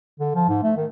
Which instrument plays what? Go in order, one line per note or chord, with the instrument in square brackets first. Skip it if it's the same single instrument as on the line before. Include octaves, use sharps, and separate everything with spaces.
[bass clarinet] D3
F3
G#2
A3
D#3